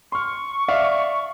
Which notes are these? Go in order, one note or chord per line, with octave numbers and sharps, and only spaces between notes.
C6 C#6 F6
D5 E5 F5